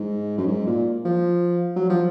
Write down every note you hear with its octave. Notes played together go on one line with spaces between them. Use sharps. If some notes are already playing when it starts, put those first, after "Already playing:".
Already playing: G#2
F#2
G#2
A#2
F3
F#3
F3